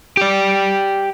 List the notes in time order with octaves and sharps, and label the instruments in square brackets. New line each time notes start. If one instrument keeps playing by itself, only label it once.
[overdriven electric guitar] G4 D5